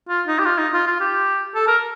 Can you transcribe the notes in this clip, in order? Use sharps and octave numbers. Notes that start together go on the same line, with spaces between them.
F4
D#4
G4
F4
D#4
F4
F4
G4
A4
A#4